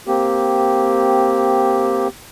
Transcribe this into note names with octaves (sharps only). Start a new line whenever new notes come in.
A#3 C4 G4